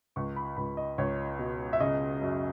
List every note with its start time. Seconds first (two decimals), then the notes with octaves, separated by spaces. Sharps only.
0.16 C#2 C#6
0.36 B5
0.57 C#2 B5
0.77 D#5
0.98 C#2 C#5
1.39 B2
1.73 E5
1.80 C#3 D#5
2.22 F#2